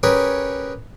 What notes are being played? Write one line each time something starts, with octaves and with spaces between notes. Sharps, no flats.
C#4 G4 G#4 A#4 B4 C#5